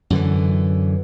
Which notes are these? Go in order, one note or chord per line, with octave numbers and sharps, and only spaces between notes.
F#2 D3 E3